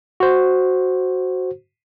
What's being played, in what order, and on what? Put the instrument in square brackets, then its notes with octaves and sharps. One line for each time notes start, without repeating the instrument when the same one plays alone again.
[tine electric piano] F#4 C5